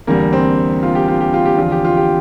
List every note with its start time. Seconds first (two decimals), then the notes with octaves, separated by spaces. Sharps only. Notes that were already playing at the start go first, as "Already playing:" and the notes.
0.07 E2 D3 G3 A#3
0.33 C4
0.83 F4
0.95 G4
1.08 F4
1.21 G4
1.34 F4
1.46 G4
1.57 E2 D3 F3 F4
1.72 G4
1.84 F4
1.97 G4